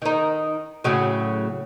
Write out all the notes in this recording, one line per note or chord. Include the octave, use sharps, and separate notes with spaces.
D#3 D#4
A2 C#3 F#3